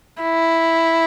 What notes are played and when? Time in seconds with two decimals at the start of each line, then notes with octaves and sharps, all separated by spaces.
0.22 E4